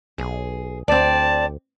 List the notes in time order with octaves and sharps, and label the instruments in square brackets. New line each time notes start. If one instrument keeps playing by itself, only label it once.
[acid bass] B1 [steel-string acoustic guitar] G#4
[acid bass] D2 [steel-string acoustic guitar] C4 D5 [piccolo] A5